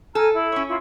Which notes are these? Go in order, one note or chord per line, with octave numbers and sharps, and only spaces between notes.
A4 G#5 A#5 F6
E4
C#4 C#5
E4 F4 C#6